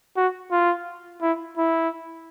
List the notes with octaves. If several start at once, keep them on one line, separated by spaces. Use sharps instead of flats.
F#4
F4
E4
E4